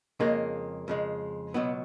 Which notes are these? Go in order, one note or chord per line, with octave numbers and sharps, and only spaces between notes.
F2 C#3 G#3 A#3
F2 C#3 G#3
C#2 B2 F#3 B3